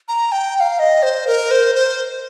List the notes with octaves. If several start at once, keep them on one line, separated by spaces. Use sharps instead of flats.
A#5
G5
G5
F5
D#5
C5
A#4
C5
C5